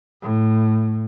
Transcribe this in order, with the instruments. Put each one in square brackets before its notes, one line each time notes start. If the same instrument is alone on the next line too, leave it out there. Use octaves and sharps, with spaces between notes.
[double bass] A2